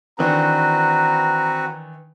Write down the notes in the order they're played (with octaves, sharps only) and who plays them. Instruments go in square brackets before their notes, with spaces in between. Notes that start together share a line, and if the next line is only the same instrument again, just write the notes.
[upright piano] D#3 E3 D4 [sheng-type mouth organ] C4 F#4 B4 [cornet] A#5